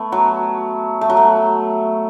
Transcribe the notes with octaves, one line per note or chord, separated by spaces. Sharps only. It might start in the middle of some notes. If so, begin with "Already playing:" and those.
Already playing: A3 B3
F#3
A3
F#3
A3